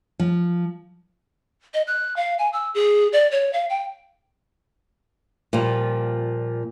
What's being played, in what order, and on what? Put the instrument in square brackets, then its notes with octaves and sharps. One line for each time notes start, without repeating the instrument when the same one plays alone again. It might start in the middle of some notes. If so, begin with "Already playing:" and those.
[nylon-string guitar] F3
[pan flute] D#5
F#6
F5
G#5
E6
G#4
D5
C#5
F5
G5
[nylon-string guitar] A#2 F3 G3